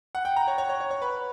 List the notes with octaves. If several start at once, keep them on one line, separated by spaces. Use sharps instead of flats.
F#5
G5
A#5
C#5
C#5
C#5
C#5
C#5
B4